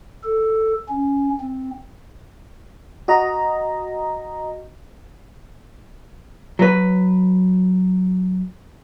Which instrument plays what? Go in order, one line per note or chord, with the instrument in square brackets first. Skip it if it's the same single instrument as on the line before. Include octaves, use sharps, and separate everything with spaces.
[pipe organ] A4
C#4
C4
[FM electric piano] F#4 D#5 A#5
[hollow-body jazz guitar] F#3 B4